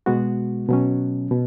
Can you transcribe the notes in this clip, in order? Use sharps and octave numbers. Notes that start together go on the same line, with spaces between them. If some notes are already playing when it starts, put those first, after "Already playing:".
B2 G#3 B3 F#4
B2 F#3 C#4
B2